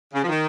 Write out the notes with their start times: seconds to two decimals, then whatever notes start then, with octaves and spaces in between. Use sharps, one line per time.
0.13 C#3
0.24 F3
0.28 D#3